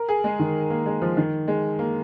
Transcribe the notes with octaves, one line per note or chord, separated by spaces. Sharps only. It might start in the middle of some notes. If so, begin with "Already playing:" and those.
Already playing: A#4
G#4
G#3
D#3
A#3
G#3
F3
D#3
G#3
A#3